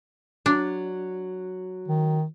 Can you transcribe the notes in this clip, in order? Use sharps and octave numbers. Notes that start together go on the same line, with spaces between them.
F#3 D4
D#3